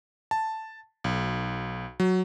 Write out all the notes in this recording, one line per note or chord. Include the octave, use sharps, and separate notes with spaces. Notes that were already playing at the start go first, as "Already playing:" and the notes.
A5
B1
F#3